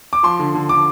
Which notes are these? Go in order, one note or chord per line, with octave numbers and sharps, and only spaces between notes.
D6
F3 C6
D3
D3
D3 D6